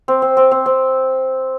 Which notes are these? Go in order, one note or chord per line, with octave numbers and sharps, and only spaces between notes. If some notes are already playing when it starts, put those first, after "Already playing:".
C4
C4
C4
C4
C4